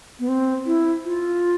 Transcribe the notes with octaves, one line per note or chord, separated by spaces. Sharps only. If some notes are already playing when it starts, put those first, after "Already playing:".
B3
C4
E4
F4